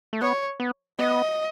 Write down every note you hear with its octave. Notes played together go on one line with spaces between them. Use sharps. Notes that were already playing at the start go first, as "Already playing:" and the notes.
A3
B3 C#5
B3
B3 D#5